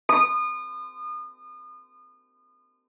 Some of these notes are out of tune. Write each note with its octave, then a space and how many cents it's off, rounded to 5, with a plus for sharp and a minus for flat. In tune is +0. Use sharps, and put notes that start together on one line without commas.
D#6 -35